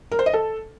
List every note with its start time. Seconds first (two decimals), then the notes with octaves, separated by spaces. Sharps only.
0.12 A#4
0.19 C5
0.26 D#5
0.33 A4